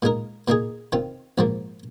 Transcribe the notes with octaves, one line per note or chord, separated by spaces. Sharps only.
A#2 G#3 D#4 A#4
A#2 A#3 D#4 G#4
D#3 C4 F4
A#1 G#2 F3 A#3